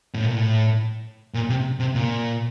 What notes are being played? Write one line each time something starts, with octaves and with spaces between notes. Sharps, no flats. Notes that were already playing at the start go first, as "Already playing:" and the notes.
A2
A#2
A2
A#2
C3
C3
A#2